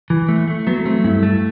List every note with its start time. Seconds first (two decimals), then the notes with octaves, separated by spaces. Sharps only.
0.10 E3
0.29 A3
0.47 A3
0.67 F#3 B3
0.85 A3 C4
1.04 G2 E4
1.23 A3